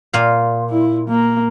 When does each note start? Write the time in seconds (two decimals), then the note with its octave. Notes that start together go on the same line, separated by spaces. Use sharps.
0.13 A#2 F5
0.70 E4
1.09 A#3